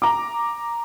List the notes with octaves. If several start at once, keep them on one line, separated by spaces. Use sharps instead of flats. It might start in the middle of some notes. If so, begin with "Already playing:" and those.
A#5 D6